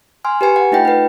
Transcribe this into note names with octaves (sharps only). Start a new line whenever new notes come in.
G#5 C6 F6
G4 B4 G#5 C#7
F#5
A3 D#4 F4 G5
D#4 B4